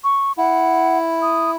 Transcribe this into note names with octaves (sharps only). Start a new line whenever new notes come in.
C#6
E4 F#5
D#6